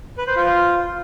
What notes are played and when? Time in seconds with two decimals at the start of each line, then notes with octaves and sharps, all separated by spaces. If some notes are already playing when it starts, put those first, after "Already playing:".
0.18 B4
0.27 C5
0.36 F4